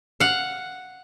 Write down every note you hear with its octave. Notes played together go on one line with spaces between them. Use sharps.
F5 F#5